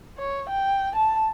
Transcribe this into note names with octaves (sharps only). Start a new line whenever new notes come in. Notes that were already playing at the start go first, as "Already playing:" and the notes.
C#5
G5
A5